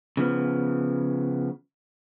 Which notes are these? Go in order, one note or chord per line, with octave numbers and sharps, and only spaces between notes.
C#3 F3 B3